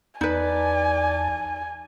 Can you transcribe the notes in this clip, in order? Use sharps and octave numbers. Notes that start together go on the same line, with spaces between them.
E2 D#4 B4 D5 G#5 A5